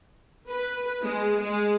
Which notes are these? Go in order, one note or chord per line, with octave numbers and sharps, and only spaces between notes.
B4
G#3
G#3